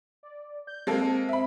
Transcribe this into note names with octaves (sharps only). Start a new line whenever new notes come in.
D5
G6
G#3 A#3 C4 A4
E5 B5